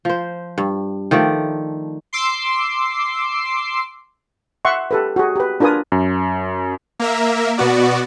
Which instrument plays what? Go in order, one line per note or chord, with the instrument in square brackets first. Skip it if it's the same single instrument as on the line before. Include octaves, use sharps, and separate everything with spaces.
[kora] F3 C5
G2
D#3 F3 A3 D5
[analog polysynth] C6 D6 E6 C7
[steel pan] E5 F#5 C6 C#6
G4 A4 B4
F#4 G#4
G4 B4
D4 F4 A#4 B4 G#5 D#6
[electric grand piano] F#2
[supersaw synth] A#3 A#4 E5
B2 B3 F#4 D5